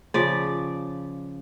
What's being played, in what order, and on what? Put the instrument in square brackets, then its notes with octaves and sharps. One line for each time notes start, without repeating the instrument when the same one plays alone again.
[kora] C#3 F3 D5